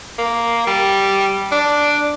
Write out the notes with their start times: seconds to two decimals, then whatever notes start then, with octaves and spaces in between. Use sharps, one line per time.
0.19 A#3
0.67 G3
1.52 D4